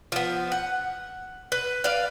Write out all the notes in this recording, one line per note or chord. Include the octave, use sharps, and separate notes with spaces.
F3 B3
F#5
B4
B4 D5 F5